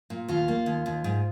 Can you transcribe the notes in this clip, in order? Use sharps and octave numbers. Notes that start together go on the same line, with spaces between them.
A#2
D#2 F4
A#3
D#2
D#2
G#2